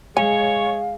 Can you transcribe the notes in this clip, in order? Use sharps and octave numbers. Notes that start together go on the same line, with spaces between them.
G#3 C#5 F5 G#5